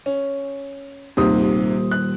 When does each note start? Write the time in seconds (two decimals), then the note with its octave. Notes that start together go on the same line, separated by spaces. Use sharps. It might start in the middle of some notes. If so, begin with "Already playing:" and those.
0.06 C#4
1.17 D#1 D#2 G#2 C3 C5 D#6
1.91 F#6